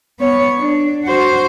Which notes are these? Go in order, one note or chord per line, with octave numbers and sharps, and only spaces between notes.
B3 C#5
D4
F#4 C5